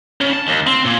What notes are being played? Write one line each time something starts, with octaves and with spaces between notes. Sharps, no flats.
C#3
A5
D#2
C4
A#2